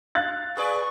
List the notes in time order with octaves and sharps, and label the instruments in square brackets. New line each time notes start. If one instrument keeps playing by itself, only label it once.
[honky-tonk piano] F5 F#6 A6
[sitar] G#4 B4 D5 [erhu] C#6